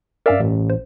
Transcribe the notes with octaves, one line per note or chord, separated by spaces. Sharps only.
G2 C#4 A#4 D5 E5 F5
A1
C5